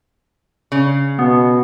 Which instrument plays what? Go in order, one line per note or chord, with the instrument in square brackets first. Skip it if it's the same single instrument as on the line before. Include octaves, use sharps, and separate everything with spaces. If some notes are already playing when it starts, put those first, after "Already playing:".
[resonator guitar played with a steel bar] C#3
[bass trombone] B2 [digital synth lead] B3